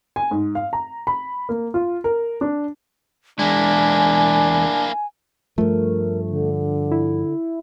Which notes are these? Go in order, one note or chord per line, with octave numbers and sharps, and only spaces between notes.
G#5
G#2
F5
A#5
B5
A#3
F4
A#4
D4
E2 G#3 A#3 D4 E4 G#5
G2 F3 A3 A#4
D3
E4